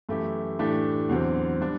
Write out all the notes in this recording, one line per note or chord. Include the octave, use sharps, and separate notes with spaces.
F#2 E3 A3 E4 G4
A2 E3 A3 D4 G4
E2 D3 F#3 C4
G3 D4